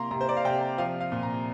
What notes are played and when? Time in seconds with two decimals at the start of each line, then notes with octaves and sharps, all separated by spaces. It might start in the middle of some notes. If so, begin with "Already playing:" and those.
Already playing: C3 A#3 A#5 C6
0.11 C3 A#5
0.21 C5
0.29 D5
0.37 F5
0.45 C3 G5
0.78 F3 F5
1.00 F5
1.12 A#2
1.23 A#5